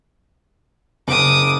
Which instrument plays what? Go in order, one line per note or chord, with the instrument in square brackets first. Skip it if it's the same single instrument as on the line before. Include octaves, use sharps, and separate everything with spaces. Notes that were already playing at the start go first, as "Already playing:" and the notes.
[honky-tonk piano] F#1 [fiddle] D6 D#6